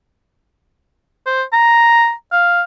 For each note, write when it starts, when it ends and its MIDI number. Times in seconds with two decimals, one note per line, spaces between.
1.26 1.43 72
1.53 2.12 82
2.32 2.62 77